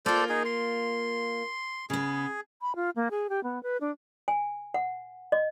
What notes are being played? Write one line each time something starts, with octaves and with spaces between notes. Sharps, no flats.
A#3 F4 A4 C5 D5
D#4 G#4
C6
C#3 B3 G#4
B5
F4
A#3
G#4
G4
B3
B4
D4
G#5
F#5
D#5